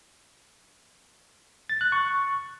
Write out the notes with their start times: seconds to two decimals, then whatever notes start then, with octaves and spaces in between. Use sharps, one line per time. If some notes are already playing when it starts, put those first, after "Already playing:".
1.69 A6
1.81 F#6
1.92 C#6